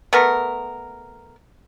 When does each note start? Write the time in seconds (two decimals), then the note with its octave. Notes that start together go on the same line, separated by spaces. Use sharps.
0.13 A3 B3 A#4